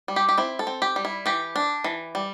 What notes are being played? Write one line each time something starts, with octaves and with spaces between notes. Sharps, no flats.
G3
G4
G4
C4 E4
A4
C4
G4
G3
E4
E3 G4
D4
E3
G3